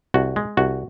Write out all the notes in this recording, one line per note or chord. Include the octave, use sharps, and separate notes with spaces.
C2 F#4
G#3
C2 F#4